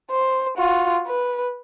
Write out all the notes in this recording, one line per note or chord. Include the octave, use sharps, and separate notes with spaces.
C5
F4 F#4
B4